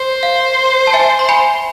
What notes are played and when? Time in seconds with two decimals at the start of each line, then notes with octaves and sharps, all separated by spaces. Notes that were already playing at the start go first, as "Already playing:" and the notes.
Already playing: C5
0.23 F5
0.87 A5
0.93 E5 G#5
1.19 C6
1.29 G#5 B5